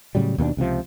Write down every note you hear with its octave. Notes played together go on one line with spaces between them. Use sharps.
A2 C#3 F#3 G3
D#2 B2 G#3 D4
C#2 C3 D#3 F3